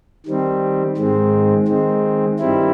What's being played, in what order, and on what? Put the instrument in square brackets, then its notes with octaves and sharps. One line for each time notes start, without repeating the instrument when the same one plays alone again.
[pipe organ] D#3 G3 C4
G#2 D#3 G#3 C4
D#3 G#3 C4
G2 D#3 G3 C4 E4